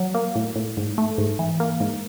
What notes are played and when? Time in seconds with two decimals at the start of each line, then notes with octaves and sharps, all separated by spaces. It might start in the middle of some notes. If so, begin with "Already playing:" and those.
Already playing: F#3
0.15 A#3
0.35 A2
0.56 A2
0.77 G#2
0.98 A3
1.18 G#2
1.39 E3
1.60 A#3
1.80 G#2